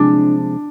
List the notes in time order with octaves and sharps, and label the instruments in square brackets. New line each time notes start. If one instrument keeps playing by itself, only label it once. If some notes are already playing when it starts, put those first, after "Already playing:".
Already playing: [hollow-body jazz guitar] C3 F3 G#3 C4 [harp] D4